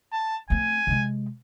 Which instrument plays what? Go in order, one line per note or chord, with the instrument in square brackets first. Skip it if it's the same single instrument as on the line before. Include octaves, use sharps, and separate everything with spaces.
[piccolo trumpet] A5
[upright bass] A3 C4 [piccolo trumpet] G#5
[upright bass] C3 G#3